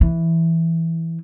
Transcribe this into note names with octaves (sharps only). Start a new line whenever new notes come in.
E3